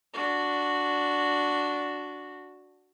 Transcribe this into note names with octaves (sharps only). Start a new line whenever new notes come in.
D4 F#4